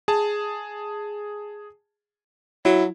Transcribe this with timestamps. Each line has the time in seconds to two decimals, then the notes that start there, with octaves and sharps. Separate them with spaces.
0.08 G#4 A5
2.65 F#3 E4